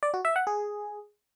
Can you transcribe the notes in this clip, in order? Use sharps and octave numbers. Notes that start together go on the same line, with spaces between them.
D5
F#4
E5
F#5
G#4